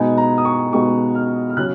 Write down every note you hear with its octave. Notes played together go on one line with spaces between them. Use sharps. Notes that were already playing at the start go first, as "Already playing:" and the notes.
Already playing: B2 G#3 B3 D#4 G#5
A#5
D#6
C#6
B2 G#3 B3 D#4 C#6
F6
F6
C#3 F#3 C#4 F#6